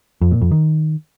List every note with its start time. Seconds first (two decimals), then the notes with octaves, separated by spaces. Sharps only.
0.21 F2
0.31 A#2
0.41 F2
0.51 D#3